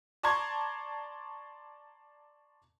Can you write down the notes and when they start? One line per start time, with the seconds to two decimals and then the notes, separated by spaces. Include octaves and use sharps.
0.23 D5 A5 A#5 C6 C#6 G#6